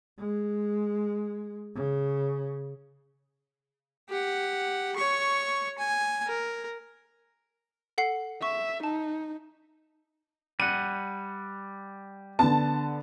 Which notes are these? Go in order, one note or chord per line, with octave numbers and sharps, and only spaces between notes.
G#3
C#3
G4 F#5
C#5 C#6
G#5
A#4
A4 F#5 C7
E5 C#6
D#4 A5
G3 F#5 D#7
D3 B3 A5